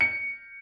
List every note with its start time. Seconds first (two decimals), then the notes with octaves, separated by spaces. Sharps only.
0.01 C#7